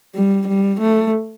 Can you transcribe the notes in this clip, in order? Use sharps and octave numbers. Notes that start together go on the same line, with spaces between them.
G3
G3
A3